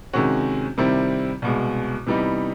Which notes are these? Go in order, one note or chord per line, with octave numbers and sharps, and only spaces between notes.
C3 D#3 G#3 C#4 F#4
C3 D#3 G3 C4 E4
C2 B2 G#3
C3 E3 G3 B3 D#4